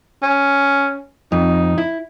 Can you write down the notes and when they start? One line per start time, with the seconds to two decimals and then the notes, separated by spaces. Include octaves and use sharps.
0.23 C#4
1.32 F2 D#4
1.78 E4